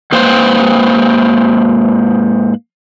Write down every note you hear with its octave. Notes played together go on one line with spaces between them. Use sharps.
G#2 A#3 B4 C5